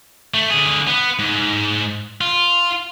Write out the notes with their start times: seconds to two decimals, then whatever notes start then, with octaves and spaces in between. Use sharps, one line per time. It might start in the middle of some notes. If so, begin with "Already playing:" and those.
0.34 A3
0.50 D3 G#4
0.87 B3
1.19 G#2
2.21 F4